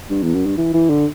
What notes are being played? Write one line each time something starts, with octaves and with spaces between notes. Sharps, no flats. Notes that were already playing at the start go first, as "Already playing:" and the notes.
G2
E2
F#2
G2
E3
E3
D3